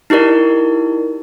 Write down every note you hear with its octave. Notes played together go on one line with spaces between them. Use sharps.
D#4 E4 G4 A#4 D5